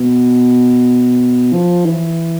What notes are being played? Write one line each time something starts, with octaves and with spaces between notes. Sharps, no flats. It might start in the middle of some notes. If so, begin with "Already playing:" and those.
Already playing: B2
F3
E3